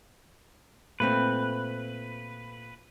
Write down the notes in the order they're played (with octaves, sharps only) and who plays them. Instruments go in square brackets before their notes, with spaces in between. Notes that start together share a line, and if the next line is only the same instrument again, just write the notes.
[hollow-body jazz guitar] A#2 A3 C4 [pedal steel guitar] B4